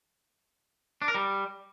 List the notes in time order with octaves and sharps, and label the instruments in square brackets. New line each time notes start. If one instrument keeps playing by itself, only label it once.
[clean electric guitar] D4
A#4
G3